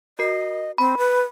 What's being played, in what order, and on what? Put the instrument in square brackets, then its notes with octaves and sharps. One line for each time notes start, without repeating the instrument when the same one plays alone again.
[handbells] F#4 A#4 C7 [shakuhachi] D#5
[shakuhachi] C4 [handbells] B5
[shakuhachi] B4